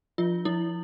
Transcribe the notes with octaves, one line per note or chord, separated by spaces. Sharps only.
F3 F4
F3 E4